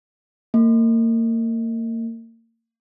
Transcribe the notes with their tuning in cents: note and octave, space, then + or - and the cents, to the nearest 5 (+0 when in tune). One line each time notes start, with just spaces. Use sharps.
A#3 -35